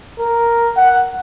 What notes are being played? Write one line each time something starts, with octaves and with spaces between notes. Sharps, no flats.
A#4
F#5